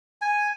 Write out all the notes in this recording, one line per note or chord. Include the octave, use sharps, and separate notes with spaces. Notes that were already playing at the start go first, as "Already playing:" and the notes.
G#5